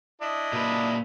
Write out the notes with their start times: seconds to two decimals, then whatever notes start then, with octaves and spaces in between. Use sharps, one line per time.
0.22 D4 E4 D#5
0.53 A#2 B4